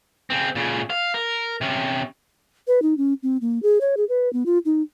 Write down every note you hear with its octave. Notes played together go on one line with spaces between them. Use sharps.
C#3 C4
A#2 C#3
F5
A#4
C3 C#4
B4
D#4
C#4
C4
A#3
G#4
C#5
G#4
B4
B3
F4
D#4